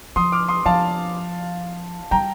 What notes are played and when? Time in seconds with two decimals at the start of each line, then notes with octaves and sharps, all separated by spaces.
0.16 F3 C6 D#6
0.32 D6 F6
0.49 C6 D#6
0.66 F3 F5 A5
2.11 G3 G5 A#5